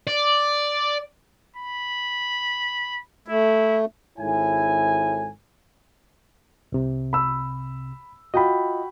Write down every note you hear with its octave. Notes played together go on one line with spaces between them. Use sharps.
D5
B5
A3 E4
G#1 G#2 E4 A4 C#5 G#5
C2 C3
B5 E6
F4 F#4 D#5 G5 B5